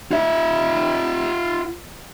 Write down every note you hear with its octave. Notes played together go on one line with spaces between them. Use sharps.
F4 E5